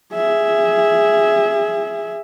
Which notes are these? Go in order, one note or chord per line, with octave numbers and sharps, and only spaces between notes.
G#4 E5